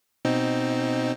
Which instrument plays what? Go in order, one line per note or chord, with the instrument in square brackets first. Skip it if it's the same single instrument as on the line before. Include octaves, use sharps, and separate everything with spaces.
[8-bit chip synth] B2 C4 D#4